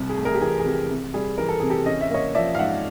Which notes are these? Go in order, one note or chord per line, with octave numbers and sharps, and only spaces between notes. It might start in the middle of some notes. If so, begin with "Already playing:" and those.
Already playing: C2 C3
G#4
A3
G#4 A#4
G4
E3 G#4
G#4
C3 G4
C3
G3 G#4
E3 A#4
A4
C3 G#4
G4 A4
C#4 D#5
E5
A#3 C#5 D#5
F3 D5 E5
F5
G#2 E5 F#5